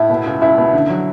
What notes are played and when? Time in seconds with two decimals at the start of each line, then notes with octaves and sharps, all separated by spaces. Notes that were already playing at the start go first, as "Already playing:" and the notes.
Already playing: A2 E4
0.10 B2
0.26 C#2
0.41 C#2 E4
0.58 B2
0.73 D3
0.89 F#3